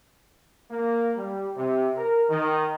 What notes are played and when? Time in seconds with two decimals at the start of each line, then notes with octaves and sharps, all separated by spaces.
0.71 A#3
1.17 G3
1.57 C3
1.96 A#4
2.29 D#3